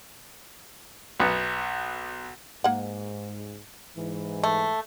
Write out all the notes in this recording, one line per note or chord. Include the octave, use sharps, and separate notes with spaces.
B1 B3
G#2 A#3 F#5
G#2 E3
A3